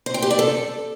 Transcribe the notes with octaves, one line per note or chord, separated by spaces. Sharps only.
C5
G5
G4
D5
A4